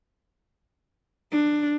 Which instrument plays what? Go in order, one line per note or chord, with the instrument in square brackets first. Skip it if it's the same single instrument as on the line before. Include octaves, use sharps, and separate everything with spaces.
[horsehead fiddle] D4